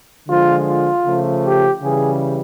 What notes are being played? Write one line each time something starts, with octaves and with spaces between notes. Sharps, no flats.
D3 F3 G#3 F4
F4
C#3 F3 A3
G4
C#3 E3 G3 G#4